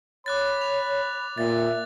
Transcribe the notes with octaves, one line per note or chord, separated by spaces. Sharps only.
C#5 B5 D6 F#6 A6
F7
A#2 E5 A6